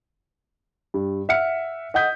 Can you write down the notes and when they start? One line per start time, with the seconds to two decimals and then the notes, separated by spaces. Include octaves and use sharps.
0.94 G2
1.29 E5 F#5 F6 C#7
1.94 D#5 F#5 D#6 G6 B6